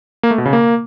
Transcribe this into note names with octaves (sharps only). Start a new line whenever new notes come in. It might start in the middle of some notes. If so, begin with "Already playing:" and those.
A#3
A3
B2
C#3
A#3